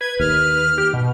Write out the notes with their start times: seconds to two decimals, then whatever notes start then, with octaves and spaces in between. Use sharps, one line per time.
0.01 B4 G#6
0.20 D#2 F6
0.78 G4
0.93 B2